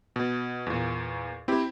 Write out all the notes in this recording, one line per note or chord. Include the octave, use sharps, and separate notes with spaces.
B2
E2 A#2
C4 E4 G4